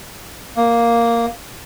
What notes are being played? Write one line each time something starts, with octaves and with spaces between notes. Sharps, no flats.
A#3